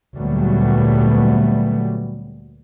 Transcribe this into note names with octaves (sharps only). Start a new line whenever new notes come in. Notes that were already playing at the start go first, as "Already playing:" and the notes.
D2 A#2 F#3 G3 A3 B3